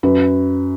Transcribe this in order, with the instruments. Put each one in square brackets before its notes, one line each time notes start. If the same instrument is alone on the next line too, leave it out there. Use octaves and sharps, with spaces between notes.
[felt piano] F#2 B4